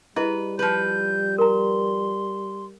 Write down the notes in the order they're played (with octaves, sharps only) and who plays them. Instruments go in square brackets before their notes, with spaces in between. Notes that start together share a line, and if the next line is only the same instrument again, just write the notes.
[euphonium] G3 [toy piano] E4 G#4 D#5 [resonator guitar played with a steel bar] B4
[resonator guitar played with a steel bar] F3 B4 [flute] G6
[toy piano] A#4 A#5 [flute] C6